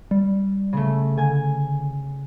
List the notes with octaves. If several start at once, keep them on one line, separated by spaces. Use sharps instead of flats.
G3
C#3 A3
D3 G#5 G#6